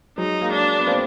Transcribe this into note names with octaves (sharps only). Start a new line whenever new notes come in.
F#3 G#3 D#4
G#3 A#3
D4
B3
A#3 C4